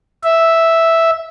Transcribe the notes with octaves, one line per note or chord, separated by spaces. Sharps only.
E5